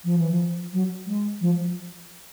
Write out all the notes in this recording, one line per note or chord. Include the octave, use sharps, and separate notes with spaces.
F3
E3
F3
F#3
G#3
F3